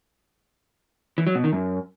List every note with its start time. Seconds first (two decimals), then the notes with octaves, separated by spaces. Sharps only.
1.18 E3
1.27 F#3
1.35 B2
1.44 D#3
1.53 F#2